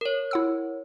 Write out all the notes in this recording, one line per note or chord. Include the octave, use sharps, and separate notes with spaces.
A#4 C#5
E4 F#5 E6